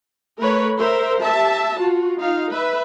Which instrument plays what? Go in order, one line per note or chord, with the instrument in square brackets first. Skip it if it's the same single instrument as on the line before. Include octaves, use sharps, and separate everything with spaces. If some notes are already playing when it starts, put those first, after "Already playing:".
[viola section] A3 A#4 B4 C#5
A#4 C5 E5
G4 E5 A5
F4 F#4
D#4 F4 F5
B4 E5